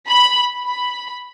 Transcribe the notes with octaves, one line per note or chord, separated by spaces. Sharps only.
B5
B5